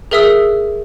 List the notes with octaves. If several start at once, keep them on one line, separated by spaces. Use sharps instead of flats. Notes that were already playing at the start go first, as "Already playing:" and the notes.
G#4 A#4 E5 D#6 E6